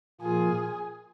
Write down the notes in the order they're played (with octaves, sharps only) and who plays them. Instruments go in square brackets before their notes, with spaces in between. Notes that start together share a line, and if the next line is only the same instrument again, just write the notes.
[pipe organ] A#2 F3 A#3 F4 [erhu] G#4